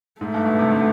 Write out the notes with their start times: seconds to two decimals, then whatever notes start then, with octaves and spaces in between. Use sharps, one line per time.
0.21 G#2 A3
0.34 G2
0.46 B2
0.59 C3
0.71 D3